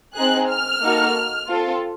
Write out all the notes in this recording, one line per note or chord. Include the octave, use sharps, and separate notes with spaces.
C4 D#4 G#4 F#6
F6
A#3 D#4 F#4 A4
C4 F4 A4